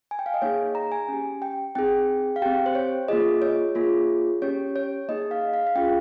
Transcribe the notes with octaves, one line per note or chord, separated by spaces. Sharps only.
G#5
G5
F5
D#5
A#3 D#4 G#4 C#5
A#5
G#5
C#4 G4
G5
C4 D#4 G#4 G5
F5
C4 G4 G5
C5
C#5
A#3 F4 G#4 D#5
C#5
A#3 F4 G#4
C#4 G4 C#5
C#5
A#3 D#4 G#4 D#5
F5
F5
F5
C#4 F4 G#4 G5